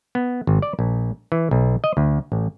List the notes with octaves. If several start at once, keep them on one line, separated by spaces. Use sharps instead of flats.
B3
G#1
D5
A#1
E3
B1
D#5
D2
A1